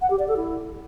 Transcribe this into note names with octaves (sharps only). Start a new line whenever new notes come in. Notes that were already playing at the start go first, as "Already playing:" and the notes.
F#5
G4
D5
A4
E4